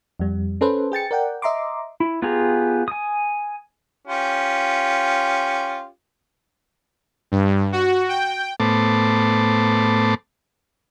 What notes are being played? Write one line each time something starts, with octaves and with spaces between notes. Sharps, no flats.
F2 G3
C#4 A4 B4 C5
G#4 G5 A6 C#7
A#4 D5 F#5 G5
D#5 E5 A#5 C6 D6
E4
B3 F4 G4 G#4 A#5
G#5 D#6
C#4 F4 G4
G2
F#4
G5
A2 A3 B3 C5 A5 D6